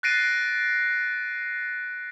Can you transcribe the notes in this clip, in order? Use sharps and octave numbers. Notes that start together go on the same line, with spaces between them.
F#6 A6 A#6 C7 D7 D#7